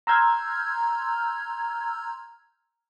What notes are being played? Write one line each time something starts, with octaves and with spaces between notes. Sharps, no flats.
A#5 C6 E6 F6 G6 G#6